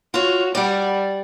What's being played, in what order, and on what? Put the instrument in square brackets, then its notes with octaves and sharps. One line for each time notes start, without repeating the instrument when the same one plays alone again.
[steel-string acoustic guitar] F4 C#5 [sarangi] F#4
[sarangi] G3 [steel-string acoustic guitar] D5 F#5